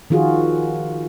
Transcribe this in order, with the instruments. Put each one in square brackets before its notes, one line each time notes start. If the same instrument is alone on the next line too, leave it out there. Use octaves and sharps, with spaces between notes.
[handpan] D#3 F3 F4 F#4 G#4